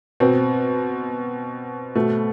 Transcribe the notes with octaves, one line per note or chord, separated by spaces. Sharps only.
B2 C4
B2 A3